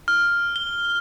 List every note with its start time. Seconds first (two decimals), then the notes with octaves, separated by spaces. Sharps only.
0.08 F6
0.56 G7